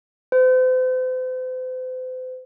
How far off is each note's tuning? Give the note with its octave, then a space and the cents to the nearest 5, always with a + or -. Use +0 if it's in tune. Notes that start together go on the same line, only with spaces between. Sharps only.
C5 -40